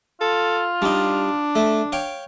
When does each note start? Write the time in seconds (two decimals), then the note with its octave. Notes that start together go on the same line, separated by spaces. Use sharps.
0.21 F4 A4
0.82 G3 D4 D#4
1.56 A3
1.92 C#5 F5 G5